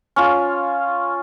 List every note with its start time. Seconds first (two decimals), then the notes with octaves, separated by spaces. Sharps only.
0.16 C#4 F4